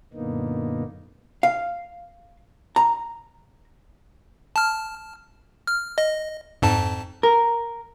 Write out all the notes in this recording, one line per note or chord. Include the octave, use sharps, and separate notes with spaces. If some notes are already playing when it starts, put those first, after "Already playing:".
F#2 A#2 D3 A#3 B3 D#4
F5
A#5
A5 F6
F6
D#5
F2 G#2 A5
A#4